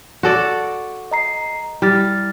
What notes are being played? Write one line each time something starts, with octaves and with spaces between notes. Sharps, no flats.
F#4 A4 D5
D#5 A#5 C7
G3 E4 F6 A6